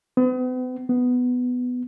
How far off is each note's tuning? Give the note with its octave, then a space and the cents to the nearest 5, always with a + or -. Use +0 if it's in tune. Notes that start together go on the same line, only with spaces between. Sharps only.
B3 +45
B3 +10